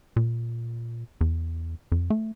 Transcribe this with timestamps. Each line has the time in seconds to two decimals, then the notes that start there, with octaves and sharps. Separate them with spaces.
0.16 A#2
1.21 E2
1.92 F2
2.10 A3